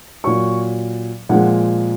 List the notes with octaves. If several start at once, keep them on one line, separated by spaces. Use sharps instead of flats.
A#2 F#3 C#6
A#2 F3 G#3 F#5